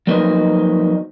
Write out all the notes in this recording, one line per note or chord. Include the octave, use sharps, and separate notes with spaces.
F3 F#3 A#3 C4 D#4 B4